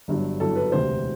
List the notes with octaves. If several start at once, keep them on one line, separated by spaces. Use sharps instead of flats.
G1 G2 F#3
G1 G2 F#3 A4
B4
E1 D2 C3 C5